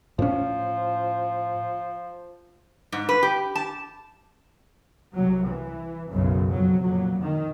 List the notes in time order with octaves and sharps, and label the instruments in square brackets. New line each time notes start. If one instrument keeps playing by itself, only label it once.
[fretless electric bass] A2 C#4 [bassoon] F3
[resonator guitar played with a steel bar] G#2
B4
G4
A5
[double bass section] C2 C3 F#3
E3
B1 F#2 C#3
F2 F#3
F2 A#2 F#3
D#3